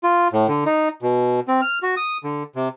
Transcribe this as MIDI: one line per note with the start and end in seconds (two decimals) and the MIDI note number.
0.04 0.28 65
0.33 0.47 45
0.48 0.64 50
0.66 0.89 63
1.02 1.40 47
1.48 1.61 60
1.62 1.79 89
1.83 1.95 66
1.97 2.17 87
2.24 2.43 50
2.56 2.69 48